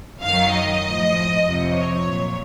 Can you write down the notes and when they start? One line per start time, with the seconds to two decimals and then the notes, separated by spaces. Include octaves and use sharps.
0.22 F#2 D#3 F#3 F5
0.54 D#5
0.84 A2 F3
1.44 F2 C3 F3
1.74 C#5
2.05 A#2 F#3